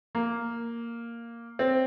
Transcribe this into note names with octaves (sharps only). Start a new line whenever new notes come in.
A#3
C4